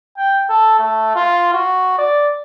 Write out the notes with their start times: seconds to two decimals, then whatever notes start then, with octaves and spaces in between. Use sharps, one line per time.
0.18 G5
0.50 A4
0.79 A3
1.15 F4
1.53 F#4
1.98 D5